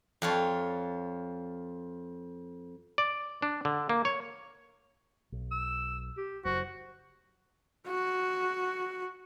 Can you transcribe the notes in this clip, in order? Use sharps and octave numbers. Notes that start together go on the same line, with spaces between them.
F2 F4 C#5
D5
D4
D3
A#3
C#5
B1
E6
G4
F#1 F#2 F#4 C5
F#4